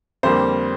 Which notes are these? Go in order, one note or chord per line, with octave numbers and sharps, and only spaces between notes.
F2 D3 G3 A#3 C5